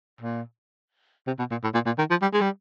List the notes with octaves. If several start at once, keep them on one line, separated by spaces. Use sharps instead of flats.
A#2
C3
B2
A#2
A2
A#2
A#2
D#3
F3
G3
G#3
G3